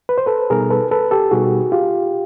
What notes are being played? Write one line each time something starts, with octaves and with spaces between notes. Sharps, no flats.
B4
C5
A4 B4
B2 G3 B3 D#4 G#4 A#4
A4 B4
A4 B4
G4 A4
B2 G3 B3 D#4 F#4 G#4
F4 G4